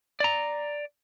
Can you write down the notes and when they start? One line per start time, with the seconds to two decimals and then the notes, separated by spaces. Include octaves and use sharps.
0.20 D5 A#5